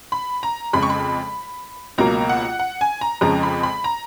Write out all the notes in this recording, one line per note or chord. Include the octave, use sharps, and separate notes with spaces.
B5
A#5
F2 C#3 G#3 B5
C#6
B5
C#2 B2 F#3 A#3 A#5
F#5
F#5
G#5
A#5
F2 C#3 F3 G#3 A#5
B5
B5
A#5